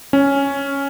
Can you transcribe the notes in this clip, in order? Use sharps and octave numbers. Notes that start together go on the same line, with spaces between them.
C#4